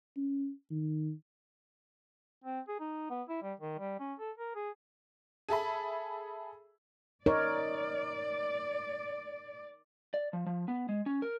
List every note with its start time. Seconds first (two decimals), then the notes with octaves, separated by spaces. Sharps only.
0.17 C#4
0.71 D#3
2.44 C4
2.68 G#4
2.80 D#4
3.10 B3
3.29 E4
3.42 G3
3.60 D#3
3.78 G3
4.00 C#4
4.19 A4
4.38 A#4
4.55 G#4
5.49 G#4 A4 E5 B5
7.26 D#4 A#4 C#5 D5
10.14 D5
10.33 F3
10.46 F3
10.68 B3
10.89 G#3
11.06 C#4
11.22 A#4